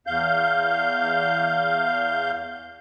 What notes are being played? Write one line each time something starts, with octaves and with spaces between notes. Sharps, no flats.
E2 F5 G6